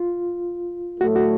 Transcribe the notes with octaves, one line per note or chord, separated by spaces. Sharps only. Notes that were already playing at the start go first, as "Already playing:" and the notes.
Already playing: F4
A2 F#3 A3 F#4
F#4